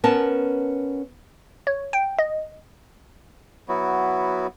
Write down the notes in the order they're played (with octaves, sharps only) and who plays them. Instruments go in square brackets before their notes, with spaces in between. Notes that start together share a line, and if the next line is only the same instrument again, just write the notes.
[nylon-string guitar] B3 C#4 A#4 A5
[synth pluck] C#5
G5
D#5
[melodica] F#3 B3 E4 F#4